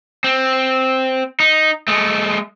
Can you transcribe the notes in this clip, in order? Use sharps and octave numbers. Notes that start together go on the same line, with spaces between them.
C4
D#4
G#3 A3